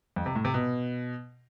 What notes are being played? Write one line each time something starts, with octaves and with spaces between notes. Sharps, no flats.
F2
C3
A2
C3
B2